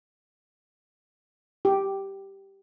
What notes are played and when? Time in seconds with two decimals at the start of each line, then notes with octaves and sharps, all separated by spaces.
1.65 G4